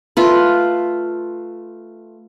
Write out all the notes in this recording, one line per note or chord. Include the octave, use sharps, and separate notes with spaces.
A3 F4 B4